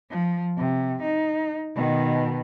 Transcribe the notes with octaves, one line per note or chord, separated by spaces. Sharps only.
F3
C3
D#4
B2 D#3